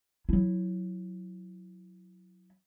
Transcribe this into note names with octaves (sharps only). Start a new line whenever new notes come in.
F#3 E4